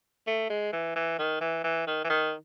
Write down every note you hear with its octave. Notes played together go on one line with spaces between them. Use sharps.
A3
G#3
E3
E3
D#3
E3
E3
D#3
E3
D#3